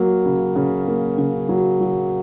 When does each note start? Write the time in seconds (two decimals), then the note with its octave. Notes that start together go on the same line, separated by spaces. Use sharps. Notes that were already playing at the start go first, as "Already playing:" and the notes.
Already playing: F#3 A#3
0.26 C#3
0.56 C#3
0.88 A#3
1.18 C#3
1.49 F#3
1.81 F#3